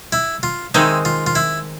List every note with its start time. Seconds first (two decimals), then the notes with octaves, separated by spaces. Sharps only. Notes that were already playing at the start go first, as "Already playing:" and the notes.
0.12 E4
0.43 F4
0.74 D#3 G#3 C4 D#4 E4
1.05 F4
1.27 F4
1.35 E4